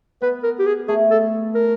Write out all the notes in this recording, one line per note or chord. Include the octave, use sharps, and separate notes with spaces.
B3 B4
A#4
G4
G#4
A3 G#4
A4
A#4